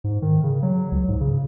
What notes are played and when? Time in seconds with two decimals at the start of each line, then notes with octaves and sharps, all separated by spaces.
0.04 G#2
0.22 D#3
0.43 C#3
0.63 F#3
0.92 C#2
1.08 G#2
1.21 C#3